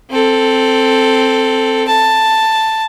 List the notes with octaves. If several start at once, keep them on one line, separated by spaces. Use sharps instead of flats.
C4 A4
A5